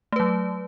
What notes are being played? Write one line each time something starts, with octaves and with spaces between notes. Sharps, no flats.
F#3 A3 B4